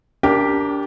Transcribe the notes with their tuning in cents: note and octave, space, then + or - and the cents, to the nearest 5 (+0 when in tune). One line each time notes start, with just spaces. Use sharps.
D4 -30 G4 +0 A#4 +0